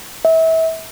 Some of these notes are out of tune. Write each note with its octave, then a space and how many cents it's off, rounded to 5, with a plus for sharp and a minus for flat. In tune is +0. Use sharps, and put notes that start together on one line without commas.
E5 -30